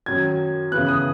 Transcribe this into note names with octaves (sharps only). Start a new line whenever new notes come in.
F#2 D#3 F#3 G#6
C#3 E3 B3 F#6
D#6